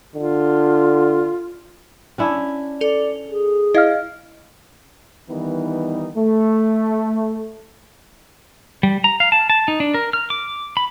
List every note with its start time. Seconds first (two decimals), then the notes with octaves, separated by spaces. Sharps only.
0.15 D3 F4
2.18 C#4 D4 E4
2.81 A4 D5 F7
3.29 G#4
3.74 E4 D#5 F5 F6
5.30 D#3 E3 G3 B3 D#4
6.16 A3
8.83 G3
9.04 A#5
9.20 F5
9.32 A5
9.50 A5
9.68 D#4
9.80 D4
9.94 A#4
10.13 F6
10.30 D6
10.77 B5